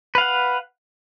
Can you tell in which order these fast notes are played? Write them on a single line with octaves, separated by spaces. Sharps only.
B4 F5 F#5